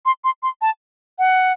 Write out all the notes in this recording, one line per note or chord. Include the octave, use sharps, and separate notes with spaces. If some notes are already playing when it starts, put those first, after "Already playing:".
C6
C6
C6
A5
F#5